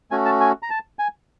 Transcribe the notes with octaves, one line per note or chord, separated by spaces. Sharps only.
A3 C#4 F#4 G#5
A5
G#5
A#5
A5
G#5